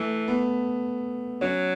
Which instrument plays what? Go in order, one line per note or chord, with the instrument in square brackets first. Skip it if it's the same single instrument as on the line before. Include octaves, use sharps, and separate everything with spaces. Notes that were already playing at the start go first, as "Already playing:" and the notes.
Already playing: [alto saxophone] E3 [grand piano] A3
[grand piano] B3
[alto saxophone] F#3 [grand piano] C#4